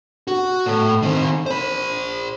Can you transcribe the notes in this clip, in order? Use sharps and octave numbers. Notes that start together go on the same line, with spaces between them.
F#4
A2
D#3 C4
C5 B5